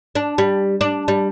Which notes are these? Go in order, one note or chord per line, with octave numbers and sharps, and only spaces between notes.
D4
G3
D4
G3